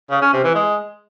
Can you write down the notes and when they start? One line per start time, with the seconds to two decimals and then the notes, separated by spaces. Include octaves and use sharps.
0.11 C#3
0.22 C#4
0.33 C3
0.44 E3
0.55 G#3